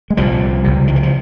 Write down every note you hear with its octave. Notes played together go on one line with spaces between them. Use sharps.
G#3
C2 A#2 F3 G3
C#2 C3
D#3
E3
F3